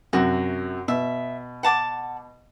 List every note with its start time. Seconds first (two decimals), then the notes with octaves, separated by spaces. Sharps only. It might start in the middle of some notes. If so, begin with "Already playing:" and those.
0.13 F#2 C3 F#4
0.88 B2 E5
1.63 F#5 A5 D6